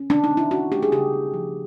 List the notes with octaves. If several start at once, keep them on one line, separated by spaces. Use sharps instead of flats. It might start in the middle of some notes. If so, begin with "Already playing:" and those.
Already playing: C#4
B2 D4
D#4
C4
E4
C#4 F#4
A3 G4
G#4
C#3 G4
B3
F3